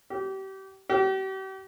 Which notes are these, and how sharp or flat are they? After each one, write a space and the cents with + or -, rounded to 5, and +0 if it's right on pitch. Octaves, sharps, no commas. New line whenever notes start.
G4 -30
G4 -40